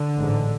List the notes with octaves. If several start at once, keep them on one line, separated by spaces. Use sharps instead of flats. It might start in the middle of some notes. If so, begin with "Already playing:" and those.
Already playing: D3
A1 G#2